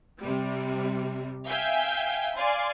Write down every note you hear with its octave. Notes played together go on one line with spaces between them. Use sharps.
C3 G3
E5 F5 G5 G#5 G6
D5 F5 G#5 C6